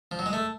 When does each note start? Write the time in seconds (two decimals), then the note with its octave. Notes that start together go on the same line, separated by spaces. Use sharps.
0.11 F3
0.19 F#3
0.26 G#3
0.33 A3